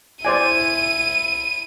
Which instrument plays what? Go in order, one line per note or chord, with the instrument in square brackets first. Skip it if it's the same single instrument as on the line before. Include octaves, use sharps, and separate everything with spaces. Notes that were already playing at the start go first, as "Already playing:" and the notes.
[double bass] E4 [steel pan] C5 D5 G#5 [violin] D#7